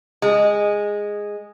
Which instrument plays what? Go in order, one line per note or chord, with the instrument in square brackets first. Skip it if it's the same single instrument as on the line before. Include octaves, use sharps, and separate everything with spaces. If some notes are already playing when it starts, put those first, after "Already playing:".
[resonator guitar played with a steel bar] G#3